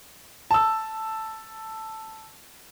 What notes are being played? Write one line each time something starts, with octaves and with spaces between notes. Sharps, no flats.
A5 E6